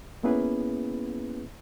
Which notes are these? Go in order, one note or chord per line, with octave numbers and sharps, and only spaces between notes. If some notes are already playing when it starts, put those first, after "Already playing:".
A#3 B3 C#4 E4 G#4 B4